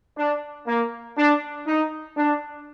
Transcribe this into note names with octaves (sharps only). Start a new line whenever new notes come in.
D4
A#3
D4
D#4
D4